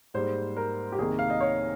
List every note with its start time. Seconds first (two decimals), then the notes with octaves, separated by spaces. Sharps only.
0.14 G#2 G3 A#3 C5
0.57 A#4
0.92 G4
0.98 C2 C3 D#3 A#3 G#4
1.19 F5
1.30 D#5
1.41 C#5